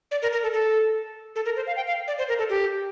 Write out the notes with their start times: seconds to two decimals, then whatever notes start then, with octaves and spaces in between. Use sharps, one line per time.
0.11 D5
0.22 A#4
0.32 A#4
0.43 A4
0.53 A4
1.36 A4
1.46 A#4
1.56 C5
1.67 F5
1.76 G5
1.87 F5
2.08 D5
2.18 C5
2.29 A#4
2.39 A4
2.49 G4